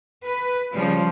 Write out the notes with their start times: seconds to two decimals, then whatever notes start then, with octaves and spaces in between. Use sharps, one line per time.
0.23 B4
0.73 C#3 F3 G3